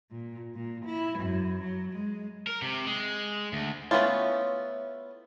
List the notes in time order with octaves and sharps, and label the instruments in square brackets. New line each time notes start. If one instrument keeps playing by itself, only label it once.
[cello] A#2
A#2
E4
F#2
F#3
G#3
[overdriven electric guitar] A#4
C3
G#3
D2
[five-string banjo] A3 B3 C#4 E4 F4